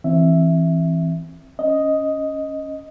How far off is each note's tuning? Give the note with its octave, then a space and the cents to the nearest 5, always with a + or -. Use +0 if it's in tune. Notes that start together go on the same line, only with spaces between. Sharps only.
E3 +0 C4 +20 E5 +0
C#4 +0 D#5 +5